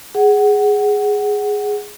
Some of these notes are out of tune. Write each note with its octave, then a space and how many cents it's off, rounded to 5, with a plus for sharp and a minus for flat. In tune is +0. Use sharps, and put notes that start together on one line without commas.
G#4 +0 F#5 +15